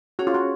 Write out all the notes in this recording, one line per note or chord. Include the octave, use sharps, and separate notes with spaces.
C#4 F#4 G#4 C#5
F4
F#4